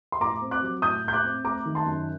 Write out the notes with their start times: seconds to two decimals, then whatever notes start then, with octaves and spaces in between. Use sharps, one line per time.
0.12 C6
0.20 A2 A#5 D6
0.41 C4
0.51 D6 F#6
0.63 F#3
0.82 A2 D#6 G6
1.04 A2 G6
1.13 D6 F#6
1.24 C4
1.44 A3 A#5 D6
1.65 D#3
1.75 A5 C6
1.86 F#2